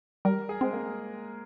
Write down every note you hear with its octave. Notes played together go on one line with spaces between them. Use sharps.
G3 A#4
G#4
G#3 C4
A#3